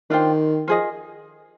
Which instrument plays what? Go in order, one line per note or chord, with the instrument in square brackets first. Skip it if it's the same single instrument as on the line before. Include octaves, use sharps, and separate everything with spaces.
[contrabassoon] D#3 [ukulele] D4 F4 C5 G5
[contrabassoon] F3 [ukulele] F4 G#4 D#5